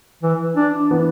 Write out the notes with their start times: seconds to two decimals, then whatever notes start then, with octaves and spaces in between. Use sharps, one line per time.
0.23 E3
0.56 D4
0.91 E3 B3